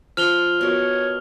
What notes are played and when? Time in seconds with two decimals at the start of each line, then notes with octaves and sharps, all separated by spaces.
0.17 F3 F6 F7 G7
0.61 B2 A#4 C#5